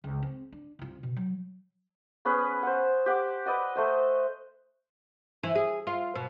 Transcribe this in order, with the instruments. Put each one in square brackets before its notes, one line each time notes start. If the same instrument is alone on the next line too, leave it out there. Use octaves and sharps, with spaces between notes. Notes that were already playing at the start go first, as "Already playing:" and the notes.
[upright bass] C#2
C4
D4
C2 F4
B2
F#3
[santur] B3 C#4 G#4 B4
C5 F#5
G4 F#5 D6
B4 D5 D#5 F#5
A3 C5 D#5
[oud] E3
G#4
F4
B2